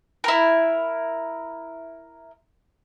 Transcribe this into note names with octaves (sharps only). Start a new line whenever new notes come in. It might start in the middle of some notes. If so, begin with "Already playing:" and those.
E4 A#4